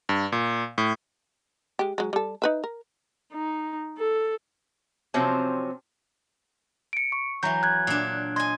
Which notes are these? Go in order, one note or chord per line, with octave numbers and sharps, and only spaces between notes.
G2
A#2
A2
G#3 G4
F#3 G#3
G3 A4
D#4 B4 E5
A#4
D#4
A4
C3 F3 F#3 C4 C#4
C#7 D7
C#6
E3 F#3 A#5 G6
F#6 G#6
A#2 D4
D#5 G#5 C6 G#6